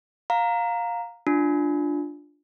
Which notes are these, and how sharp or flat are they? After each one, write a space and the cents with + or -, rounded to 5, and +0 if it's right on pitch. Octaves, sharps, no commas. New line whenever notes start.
F5 +20 A#5 -5
D4 +0 F4 +0